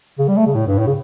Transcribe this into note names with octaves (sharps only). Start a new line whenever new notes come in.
C#3
G3
A3
C#3
A2
G2
A2
C#3